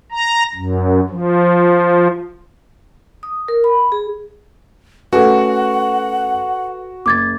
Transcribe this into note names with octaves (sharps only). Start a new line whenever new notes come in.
A#5
F#2
F3
D#6
A#4
B5
G#4
A3 C#4 F#4 G#4 A4 B4 F#5
F#1 D6 G#6 A6